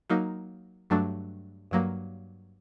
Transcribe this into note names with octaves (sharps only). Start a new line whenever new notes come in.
F#3 A#3 D#4
G2 F#3 A3 D4
G2 F#3 A#3